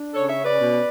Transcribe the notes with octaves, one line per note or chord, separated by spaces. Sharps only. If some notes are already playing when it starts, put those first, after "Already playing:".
Already playing: D4
C#3 A4 C#5
C#5 E5
C#4
B4 D5
B2